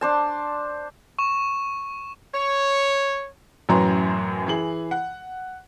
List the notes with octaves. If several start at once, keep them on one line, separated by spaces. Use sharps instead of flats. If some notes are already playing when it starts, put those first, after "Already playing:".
D4 C5 A5
C#6 E7
C#5
A1 F#2 F#3 B4 A#5 C6
E3 G#4 F#7
F#5